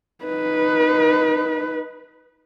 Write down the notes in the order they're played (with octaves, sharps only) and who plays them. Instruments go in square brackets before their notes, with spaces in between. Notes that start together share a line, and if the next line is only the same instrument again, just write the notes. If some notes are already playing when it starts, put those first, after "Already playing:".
[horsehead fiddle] D#4 B4